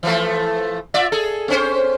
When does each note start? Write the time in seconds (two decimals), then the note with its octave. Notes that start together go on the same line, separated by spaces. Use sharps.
0.03 E3 F3 A3
0.94 F4 D5 E5
1.12 G#4 A4
1.48 C4 C#4 C5